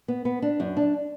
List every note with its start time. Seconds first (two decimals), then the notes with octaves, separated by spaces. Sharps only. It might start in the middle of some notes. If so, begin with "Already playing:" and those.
0.08 B3
0.25 B3
0.42 D4
0.60 F#2
0.77 D4